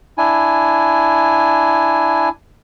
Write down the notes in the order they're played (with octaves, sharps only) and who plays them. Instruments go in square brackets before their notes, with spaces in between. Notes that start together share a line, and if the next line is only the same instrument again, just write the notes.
[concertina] D4 E4 G#5